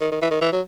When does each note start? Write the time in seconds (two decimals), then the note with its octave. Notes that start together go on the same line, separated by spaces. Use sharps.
0.01 D#3
0.12 D#3
0.21 E3
0.31 D#3
0.41 E3
0.52 F#3